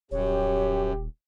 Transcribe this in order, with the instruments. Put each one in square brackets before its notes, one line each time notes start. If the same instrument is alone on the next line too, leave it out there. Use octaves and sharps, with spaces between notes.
[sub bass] D#1 [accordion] F#2 [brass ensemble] G4 [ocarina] C#5